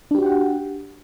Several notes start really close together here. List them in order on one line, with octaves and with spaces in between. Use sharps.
D4 G4 F#4 G5 F#5